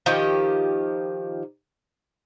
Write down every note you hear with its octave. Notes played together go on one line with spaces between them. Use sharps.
D#3 F3 G4 D#5